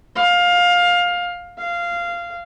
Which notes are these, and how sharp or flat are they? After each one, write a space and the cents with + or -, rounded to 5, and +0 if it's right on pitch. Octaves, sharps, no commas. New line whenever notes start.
F5 +20
F5 -15